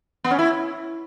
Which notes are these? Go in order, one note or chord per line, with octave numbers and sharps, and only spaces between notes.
B3
C#4
E4